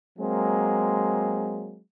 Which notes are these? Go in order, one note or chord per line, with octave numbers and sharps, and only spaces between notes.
F#3 G#3 A#3 C4